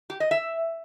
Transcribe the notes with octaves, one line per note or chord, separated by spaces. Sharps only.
G4
D#5
E5